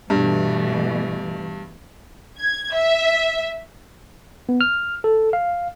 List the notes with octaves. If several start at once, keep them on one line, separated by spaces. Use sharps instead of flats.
G2 B2 E3 A3
G#6
E5
B3
F6
A4
F5